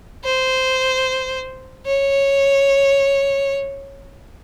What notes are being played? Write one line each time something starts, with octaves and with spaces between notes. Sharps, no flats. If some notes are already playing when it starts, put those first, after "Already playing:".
C5
C#5